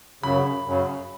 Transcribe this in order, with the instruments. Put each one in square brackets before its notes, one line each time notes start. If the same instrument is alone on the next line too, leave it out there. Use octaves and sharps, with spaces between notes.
[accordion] F#2 C#3 F#3 [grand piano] B5
[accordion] F#2 C#3 F#3